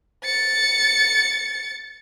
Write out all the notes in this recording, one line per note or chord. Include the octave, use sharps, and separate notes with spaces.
A6 C#7